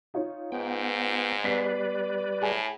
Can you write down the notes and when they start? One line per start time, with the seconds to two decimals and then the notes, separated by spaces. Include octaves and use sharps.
0.14 D#4 F4 C#5
0.52 G#2 B3 G5
1.44 G3 B3 B4 D5 B6 C7
2.42 A2 G#4 G#5